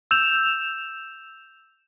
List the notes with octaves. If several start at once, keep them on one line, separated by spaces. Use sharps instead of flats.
E6 G6 E7 F7